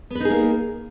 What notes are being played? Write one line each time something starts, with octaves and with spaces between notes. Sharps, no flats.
A#3 B3 D#4 G#4 B4